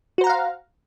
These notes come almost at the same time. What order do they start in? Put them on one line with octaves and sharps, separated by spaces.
F#4 C5 A#5 F#5 F5